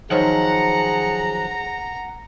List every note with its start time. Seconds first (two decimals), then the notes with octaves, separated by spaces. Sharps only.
0.11 D#3 F3 F#3 G#4 F#5 A#5